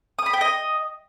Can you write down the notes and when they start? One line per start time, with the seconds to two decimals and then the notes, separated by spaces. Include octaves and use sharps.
0.19 D#6
0.26 B5
0.33 G5
0.41 D#5